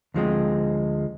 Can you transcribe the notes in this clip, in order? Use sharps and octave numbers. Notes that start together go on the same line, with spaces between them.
D2 F3 G#3 C4